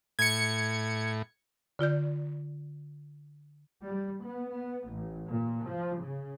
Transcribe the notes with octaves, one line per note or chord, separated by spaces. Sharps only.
A2 G#6 C#7
D3 F4 D5 G6
G3
B3
B3
A1
A#2
F3
C#3